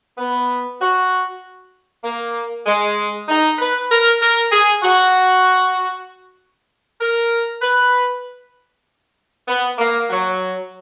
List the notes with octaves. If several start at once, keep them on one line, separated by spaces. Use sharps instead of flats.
B3
F#4
A#3
G#3
D#4
B4
A#4
A#4
G#4
F#4
A#4
B4
B3
A#3
F#3